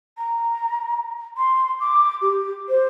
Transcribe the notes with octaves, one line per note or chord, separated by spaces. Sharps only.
A#5
C6
D6
G4
C5